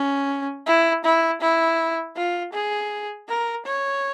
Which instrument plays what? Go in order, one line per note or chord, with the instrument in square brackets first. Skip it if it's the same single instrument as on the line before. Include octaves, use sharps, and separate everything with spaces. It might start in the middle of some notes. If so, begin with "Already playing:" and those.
Already playing: [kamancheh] C#4
E4
E4
E4
F4
G#4
A#4
C#5